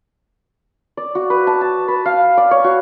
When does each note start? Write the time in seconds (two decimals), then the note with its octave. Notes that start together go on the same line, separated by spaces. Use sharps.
0.97 D5
1.15 F#4
1.30 B4
1.47 A5
1.61 A5
1.88 B4
2.05 F5
2.37 D5
2.51 C#5
2.64 F#4